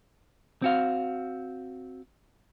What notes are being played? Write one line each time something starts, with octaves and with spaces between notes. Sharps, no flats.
C4 F#4 F5